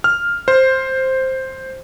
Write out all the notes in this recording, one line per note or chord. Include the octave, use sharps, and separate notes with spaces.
F6
C5